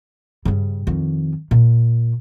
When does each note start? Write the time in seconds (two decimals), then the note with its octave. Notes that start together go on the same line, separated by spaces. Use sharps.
0.45 G2 C#3
0.87 F2 D#3
1.51 A#2